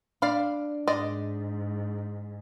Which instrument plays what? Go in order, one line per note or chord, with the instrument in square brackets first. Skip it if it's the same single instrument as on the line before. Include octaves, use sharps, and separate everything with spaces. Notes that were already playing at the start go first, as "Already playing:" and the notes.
[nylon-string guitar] D4 [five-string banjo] D5 F5 B5
[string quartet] G#2 [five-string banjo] G#3 D5 D#5